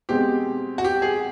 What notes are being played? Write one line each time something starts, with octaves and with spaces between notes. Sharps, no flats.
B2 G#3 C4 G4
F#4
G4
G#4